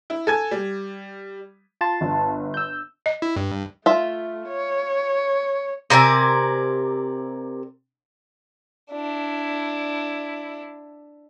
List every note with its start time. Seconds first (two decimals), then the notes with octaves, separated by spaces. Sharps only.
0.10 E4
0.27 A4 G#5 G#6
0.51 G3
1.81 F4 A5 C6
2.01 G1
2.54 E6 G6
3.06 D#5
3.22 E4
3.36 G2
3.86 A3 F4 E5
4.48 C#5
5.90 C3 A#4 D5 G#5
8.91 D4 E4